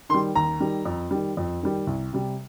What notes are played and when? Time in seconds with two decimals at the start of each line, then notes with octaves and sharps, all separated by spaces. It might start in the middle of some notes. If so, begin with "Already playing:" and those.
0.09 D#3 C6
0.14 G3
0.35 D#2 A#5
0.60 D#3 G3
0.85 F2
1.11 D#3 G3
1.37 F2
1.63 D#3 G3
1.87 C2
2.13 C3 G3